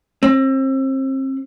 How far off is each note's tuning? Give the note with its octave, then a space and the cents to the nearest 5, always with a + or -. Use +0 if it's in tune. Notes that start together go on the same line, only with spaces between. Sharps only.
C4 +35